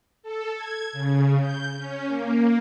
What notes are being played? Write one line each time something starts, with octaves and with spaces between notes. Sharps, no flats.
A4
G#6
C#3
G6
C#4
A#3